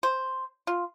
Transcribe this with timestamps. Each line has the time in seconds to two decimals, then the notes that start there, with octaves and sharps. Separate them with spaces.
0.03 C5
0.67 F4